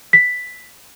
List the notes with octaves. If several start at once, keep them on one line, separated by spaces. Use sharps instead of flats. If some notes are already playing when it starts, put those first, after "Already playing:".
B6